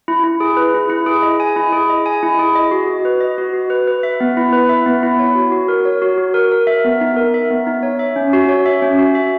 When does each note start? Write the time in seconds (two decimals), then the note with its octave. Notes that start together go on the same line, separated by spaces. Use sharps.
0.08 E4
0.24 E4
0.40 G#4
0.57 B4
0.74 E4
0.90 E4
1.06 G#4
1.22 D#5
1.40 G#5
1.56 E4
1.72 G#4
1.90 D#5
2.06 G#5
2.23 E4
2.39 G#4
2.55 D#5
2.71 F#4
2.88 F#4
3.05 B4
3.21 D#5
3.38 F#4
3.54 F#4
3.70 B4
3.87 B4
4.03 E5
4.20 B3
4.37 E4
4.53 B4
4.69 E5
4.86 B3
5.03 E4
5.19 C#5
5.35 F#4
5.52 F#4
5.68 A#4
5.85 C#5
6.02 F#4
6.18 F#4
6.34 A#4
6.52 A#4
6.67 E5
6.85 B3
7.01 D#4
7.17 A#4
7.34 E5
7.50 B3
7.67 D#4
7.83 C#5
7.99 E5
8.16 C#4
8.33 F#4
8.49 C#5
8.66 E5
8.82 C#4
8.99 F#4
9.15 E5